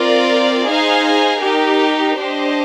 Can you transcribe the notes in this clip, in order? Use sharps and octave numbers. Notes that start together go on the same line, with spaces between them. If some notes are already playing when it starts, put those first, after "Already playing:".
Already playing: C4 F4 A#4 D5
D#4 G#4 C5 F5 G#5
D#4 G4 A#4
D4 G4 C5 D#5